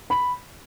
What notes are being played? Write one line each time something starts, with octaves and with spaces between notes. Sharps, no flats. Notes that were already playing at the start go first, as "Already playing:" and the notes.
B5